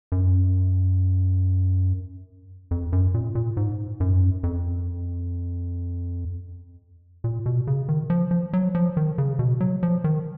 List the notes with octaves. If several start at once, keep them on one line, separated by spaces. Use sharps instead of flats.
F#2
F2
F#2
A#2
A#2
G#2
F#2
F2
A#2
B2
C#3
D#3
F3
F3
F#3
F3
D#3
C#3
B2
F#3
F3
D#3